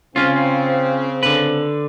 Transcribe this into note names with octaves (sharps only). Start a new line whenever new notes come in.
C#3 C4 C#4 F4
D3 B4